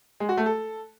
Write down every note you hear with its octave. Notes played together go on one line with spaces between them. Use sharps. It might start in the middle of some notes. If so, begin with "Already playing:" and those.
G#3
F#4
A3
A4